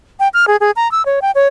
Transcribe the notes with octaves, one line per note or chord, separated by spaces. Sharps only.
G5
F6
G#4
G#4
A#5
E6
C#5
G5
C#5